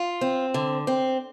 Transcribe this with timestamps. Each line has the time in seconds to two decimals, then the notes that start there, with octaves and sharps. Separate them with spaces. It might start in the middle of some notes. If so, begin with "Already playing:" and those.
Already playing: F4
0.21 C4
0.54 D3
0.87 C4